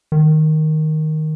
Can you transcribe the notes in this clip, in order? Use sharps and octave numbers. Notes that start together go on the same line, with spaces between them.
D#3